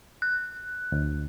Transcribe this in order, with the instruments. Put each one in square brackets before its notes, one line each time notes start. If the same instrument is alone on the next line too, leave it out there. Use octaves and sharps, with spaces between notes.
[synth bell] F#6
[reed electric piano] D2